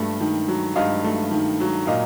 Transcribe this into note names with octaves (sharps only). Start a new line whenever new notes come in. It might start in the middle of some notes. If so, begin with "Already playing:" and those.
Already playing: G2 A3
D#3
F#3
G2 D#5 F5
A3
D#3
F#3
A#2 D#5 F5